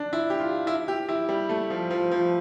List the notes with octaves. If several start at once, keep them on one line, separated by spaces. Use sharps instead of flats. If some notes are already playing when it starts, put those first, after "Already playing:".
Already playing: D4
E4
G4
F4
E4
G4
E4
G3
A3
F3
F3
F3